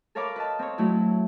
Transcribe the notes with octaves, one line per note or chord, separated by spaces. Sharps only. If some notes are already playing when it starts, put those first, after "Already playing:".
A4 A#4 C#5 F5 B5 D6
B4 D#5 A5
C4 C#5
F#3 A3 E4